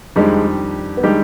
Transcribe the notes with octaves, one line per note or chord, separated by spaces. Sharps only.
F2 D#3 G3 G#3 D4 G4
B3
D#3 G3 G#3 D4 G4